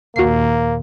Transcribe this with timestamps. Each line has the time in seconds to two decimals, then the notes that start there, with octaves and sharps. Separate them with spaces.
0.16 D#2 A#2 A#3 F#4 C7